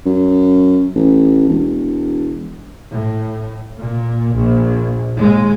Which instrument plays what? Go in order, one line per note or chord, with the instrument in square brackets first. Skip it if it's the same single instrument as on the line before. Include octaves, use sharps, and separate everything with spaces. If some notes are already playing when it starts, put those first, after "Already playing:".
[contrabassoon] F#2
A1
E1
[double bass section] A2
A#2
A#1
D#2 G#3